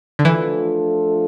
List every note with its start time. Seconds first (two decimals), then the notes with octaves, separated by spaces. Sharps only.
0.19 D3
0.25 E3 F3 A3 D4 F4 A4